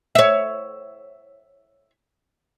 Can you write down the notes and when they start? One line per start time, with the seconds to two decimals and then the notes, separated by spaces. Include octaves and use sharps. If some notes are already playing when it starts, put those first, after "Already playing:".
0.15 C#5 E5